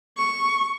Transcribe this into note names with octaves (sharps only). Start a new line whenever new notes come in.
C#6